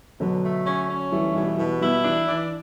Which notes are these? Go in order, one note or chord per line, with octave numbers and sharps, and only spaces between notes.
B2 D3 F#3
A3
C#4
C#4
E3 G3 A3
B2 E3 G3
B2 E3 G3
G3 B3 E4
E3 D4
E3 D4